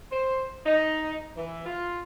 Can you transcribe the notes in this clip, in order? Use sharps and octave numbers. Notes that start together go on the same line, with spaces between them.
C5
D#4
E3
F4